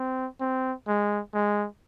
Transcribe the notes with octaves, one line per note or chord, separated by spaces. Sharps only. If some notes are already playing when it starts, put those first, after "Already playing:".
Already playing: C4
C4
G#3
G#3